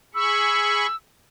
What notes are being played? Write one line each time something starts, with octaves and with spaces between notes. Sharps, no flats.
G#4 B5 C#6 E6